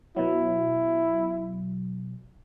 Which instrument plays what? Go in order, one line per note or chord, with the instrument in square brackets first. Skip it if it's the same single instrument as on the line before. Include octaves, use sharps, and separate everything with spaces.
[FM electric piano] B2 F#3 [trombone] E4